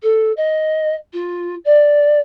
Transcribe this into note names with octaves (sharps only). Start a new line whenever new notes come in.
A4
D#5
F4
D5